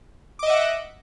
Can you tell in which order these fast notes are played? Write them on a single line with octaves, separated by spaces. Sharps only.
D6 D#5 E5 F#5